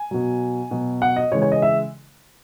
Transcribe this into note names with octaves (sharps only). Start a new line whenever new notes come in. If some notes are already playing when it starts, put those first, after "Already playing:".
Already playing: G#5
B2 F#3
B2 F#3
F#5
D#5
C#3 E3 G#3 C#5
C#5
D#5
E5